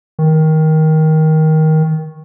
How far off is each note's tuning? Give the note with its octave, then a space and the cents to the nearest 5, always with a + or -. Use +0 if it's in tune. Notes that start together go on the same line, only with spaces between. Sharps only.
D#3 +15